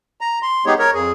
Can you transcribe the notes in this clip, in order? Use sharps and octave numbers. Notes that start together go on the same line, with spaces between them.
A#5
C6
G#3 B3 D#4 G4 G#4 C#5
A#4 C#5
F2 G#4